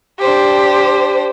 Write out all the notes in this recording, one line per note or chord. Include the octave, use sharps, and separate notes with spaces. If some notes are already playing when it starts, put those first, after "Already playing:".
D4 G4 C5